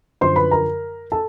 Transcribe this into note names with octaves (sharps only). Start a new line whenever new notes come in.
F#2 D3 F3 C5 C6
B4 B5
A#4 A#5
A4 A5